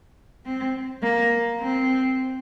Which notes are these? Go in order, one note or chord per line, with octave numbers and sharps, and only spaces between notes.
C4
A#3
C4